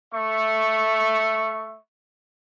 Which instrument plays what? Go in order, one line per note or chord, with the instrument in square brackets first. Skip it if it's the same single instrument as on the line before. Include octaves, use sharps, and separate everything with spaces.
[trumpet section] A3 E5 C#6